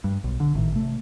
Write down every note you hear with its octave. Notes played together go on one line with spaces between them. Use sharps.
G2
B1
D3
G#1 A2 D#3
C3 A3